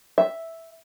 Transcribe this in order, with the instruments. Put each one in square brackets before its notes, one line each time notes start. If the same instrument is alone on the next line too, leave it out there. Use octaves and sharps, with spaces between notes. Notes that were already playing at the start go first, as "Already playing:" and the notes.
[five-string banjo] E5